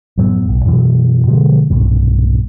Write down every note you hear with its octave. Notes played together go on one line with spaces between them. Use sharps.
F#2 A2 F#3 B3
B1
F#2 B2 E3 F#3
B2 D3 F3 G#3
B1 G2 A#2